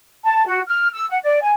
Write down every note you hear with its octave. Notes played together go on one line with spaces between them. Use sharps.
A5
F#4
F6
E6
F#5
D5
G#5